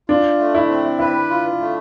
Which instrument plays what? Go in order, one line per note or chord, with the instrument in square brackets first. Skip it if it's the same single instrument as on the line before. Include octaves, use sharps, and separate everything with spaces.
[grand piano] D4 [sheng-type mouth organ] F4
[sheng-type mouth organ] A3
[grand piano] E4
[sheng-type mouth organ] C4
[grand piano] E4 [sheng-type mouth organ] B4
[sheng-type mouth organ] F4
A3